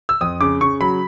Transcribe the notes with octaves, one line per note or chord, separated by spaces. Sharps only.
E6
F2 D#6
C#3 D6
C#3 C#6
F#3 B5